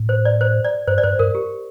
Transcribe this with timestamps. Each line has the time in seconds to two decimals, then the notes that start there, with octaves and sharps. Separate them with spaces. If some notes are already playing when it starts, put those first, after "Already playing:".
Already playing: A2
0.09 C5
0.25 D5
0.41 C5
0.65 D5
0.88 G2 C5
0.98 D5
1.03 G2 C5
1.19 G2 A#4
1.35 G4